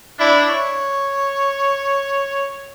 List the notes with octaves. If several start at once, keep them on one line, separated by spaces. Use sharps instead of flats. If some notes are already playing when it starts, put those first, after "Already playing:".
D4 E4
C#5